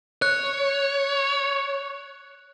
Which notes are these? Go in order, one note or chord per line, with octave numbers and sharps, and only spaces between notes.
C#5 F#6